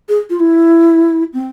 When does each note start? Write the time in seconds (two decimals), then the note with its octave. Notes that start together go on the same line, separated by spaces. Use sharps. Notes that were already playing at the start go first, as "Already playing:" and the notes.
0.09 G#4
0.30 F4
0.40 E4
1.33 C4